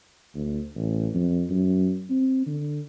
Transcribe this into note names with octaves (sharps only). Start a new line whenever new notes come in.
D2
A1
F2
F#2
C4
D3